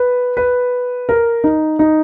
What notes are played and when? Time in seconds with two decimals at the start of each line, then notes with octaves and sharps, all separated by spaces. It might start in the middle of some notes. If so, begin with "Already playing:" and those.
Already playing: B4
0.37 B4
1.09 A#4
1.44 D#4
1.79 D#4